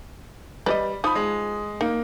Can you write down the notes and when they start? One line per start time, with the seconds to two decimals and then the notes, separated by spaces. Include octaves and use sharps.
0.66 G3 B4 C5 D#5
1.04 F3 D#4 B5 D#6
1.15 G#3
1.81 A#3 D#4